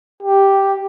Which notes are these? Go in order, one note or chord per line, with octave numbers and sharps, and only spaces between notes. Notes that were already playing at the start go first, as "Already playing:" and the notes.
G4